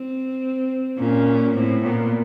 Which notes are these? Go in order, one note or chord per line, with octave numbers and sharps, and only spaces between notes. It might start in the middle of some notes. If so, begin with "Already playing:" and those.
Already playing: C4
A#2 C#4
A2 C4
A#2 B3